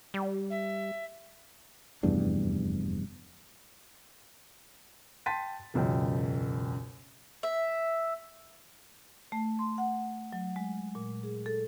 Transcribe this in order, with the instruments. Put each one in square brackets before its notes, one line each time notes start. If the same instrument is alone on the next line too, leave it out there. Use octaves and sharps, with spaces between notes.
[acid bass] G3
[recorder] E5
[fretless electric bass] F1 E2 G2 D4
[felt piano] G5 A5 C6 A6 B6 D#7
E1 C#2 F#2 G5
[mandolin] E5
[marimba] A3
C6
F#5
F#3
G#3
A#2
G#4
A4